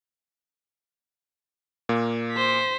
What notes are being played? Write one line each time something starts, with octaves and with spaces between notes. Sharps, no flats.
A#2 A#3
C5 B6